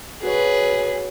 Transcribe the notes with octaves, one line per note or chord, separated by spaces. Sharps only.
F#4 G#4 B4 C#5